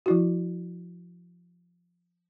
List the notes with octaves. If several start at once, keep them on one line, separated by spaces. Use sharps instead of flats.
F3 E4 F#4